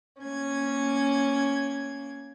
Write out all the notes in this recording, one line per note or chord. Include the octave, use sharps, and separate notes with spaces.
A#3 C#4 G#6